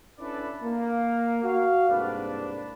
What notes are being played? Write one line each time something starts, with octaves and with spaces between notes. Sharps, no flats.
C#4 D4 E4 A4 B4 D5
A#3
F#4 F5
C2 G#2 A#3 D4 B4 D5